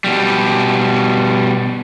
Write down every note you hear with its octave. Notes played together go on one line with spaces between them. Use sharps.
B2 G3